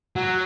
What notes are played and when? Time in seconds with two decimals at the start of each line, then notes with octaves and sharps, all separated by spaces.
0.16 F#3